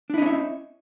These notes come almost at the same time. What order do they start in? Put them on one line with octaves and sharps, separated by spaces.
D4 E4 D#5 C#4 E5